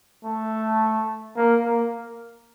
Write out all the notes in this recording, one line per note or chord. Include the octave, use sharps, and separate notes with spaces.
A3
A#3
A#3